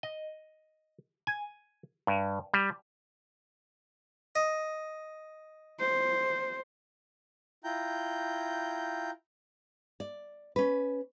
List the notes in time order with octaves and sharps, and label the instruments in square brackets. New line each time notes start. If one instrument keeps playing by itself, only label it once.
[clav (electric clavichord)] D#5
G#5
G2
G3
[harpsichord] D#5
[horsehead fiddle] C5
[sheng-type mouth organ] E4 F4 G5 A#5 G6
[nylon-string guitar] D5
C#4 B4